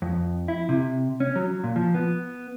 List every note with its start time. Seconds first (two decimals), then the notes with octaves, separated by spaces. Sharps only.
0.02 F2
0.48 E4
0.69 C3
1.20 C#4
1.36 F#3
1.64 A#2
1.76 F3
1.94 B3